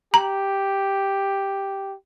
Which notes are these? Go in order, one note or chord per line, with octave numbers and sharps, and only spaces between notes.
G4 A#5